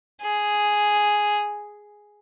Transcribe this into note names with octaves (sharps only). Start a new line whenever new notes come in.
G#4